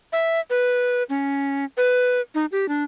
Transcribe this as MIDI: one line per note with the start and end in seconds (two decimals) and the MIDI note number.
0.13 0.40 76
0.50 1.03 71
1.09 1.65 61
1.77 2.21 71
2.35 2.46 63
2.52 2.68 67
2.69 2.83 62